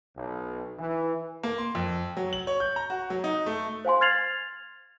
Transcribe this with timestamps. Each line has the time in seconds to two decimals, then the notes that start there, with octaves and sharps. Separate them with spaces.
0.16 B1
0.78 E3
1.43 A#3
1.58 C6
1.75 F2
2.17 F#3
2.33 F#7
2.47 C#5
2.60 G6
2.76 A#5
2.90 F#4
3.10 F#3
3.24 D#4
3.46 A3
3.85 C5 F5 G#5 C6
4.01 F6 G#6 A6 C7 F7 F#7